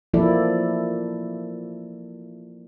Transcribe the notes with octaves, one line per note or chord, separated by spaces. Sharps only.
F3 A#3 E4 A4 D5